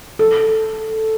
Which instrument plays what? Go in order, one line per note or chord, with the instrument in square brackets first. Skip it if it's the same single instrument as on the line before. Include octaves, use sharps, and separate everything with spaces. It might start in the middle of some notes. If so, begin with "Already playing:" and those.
[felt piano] A4